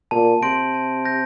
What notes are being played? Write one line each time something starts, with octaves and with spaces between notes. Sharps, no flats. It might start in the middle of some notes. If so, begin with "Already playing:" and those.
A#2 A5
C3 C6 G6 A#6 D7
A5
C6 G6 A#6 D7